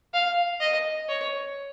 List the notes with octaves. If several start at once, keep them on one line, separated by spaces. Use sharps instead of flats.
F5
D#5
C#5